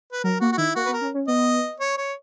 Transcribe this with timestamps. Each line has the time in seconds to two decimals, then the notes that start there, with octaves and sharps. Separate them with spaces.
0.12 B4
0.24 F#3 A#4
0.41 A#3 F#4
0.52 F#4
0.58 D#3 E4
0.76 A#3 F#4
0.86 B4
0.88 B3
0.93 A#4
1.01 C#4
1.14 C#4
1.28 B3 D#5
1.80 C#5
1.97 C#5